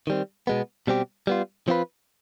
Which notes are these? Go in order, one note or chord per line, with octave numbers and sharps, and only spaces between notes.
D#3 G3 C4
B2 G#3 B3
B2 G3 C4 G4
G3 B3 F4
F3 C4 F4 B4